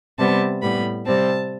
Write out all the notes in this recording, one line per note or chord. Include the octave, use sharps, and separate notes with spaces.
C3 G3 B3 A5
A2 G3 B3 B5
C3 G3 C4 A5